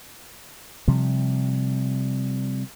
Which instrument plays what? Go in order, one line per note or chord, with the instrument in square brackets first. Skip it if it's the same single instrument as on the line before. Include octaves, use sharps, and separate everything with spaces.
[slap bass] C3 F3 G3